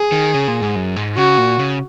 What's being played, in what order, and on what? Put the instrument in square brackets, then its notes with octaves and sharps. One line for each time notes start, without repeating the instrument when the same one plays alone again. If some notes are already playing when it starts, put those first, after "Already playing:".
Already playing: [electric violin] G#4
[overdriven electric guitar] D#3
C#3
A#2
G#2
F#2
G#2
[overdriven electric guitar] C#3 [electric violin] F#4
[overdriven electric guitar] A#2
C#3